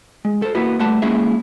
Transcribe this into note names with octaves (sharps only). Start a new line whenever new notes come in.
G#3
A4 C5
A#3 B3 E4 F#4 B4
G3 A3 B4 F#5 A5 C6
G#3 A#3 C#4 E4 G#4 E5